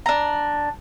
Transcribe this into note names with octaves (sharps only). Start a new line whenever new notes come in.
D4 A#5